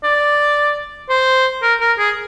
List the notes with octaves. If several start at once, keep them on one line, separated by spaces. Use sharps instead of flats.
D5
C5
A#4
A#4
G#4